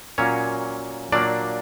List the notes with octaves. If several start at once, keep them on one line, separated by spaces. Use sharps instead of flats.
A#2 F#3 A#3 C#4 C#5
A#2 F#3 A#3 D4 D5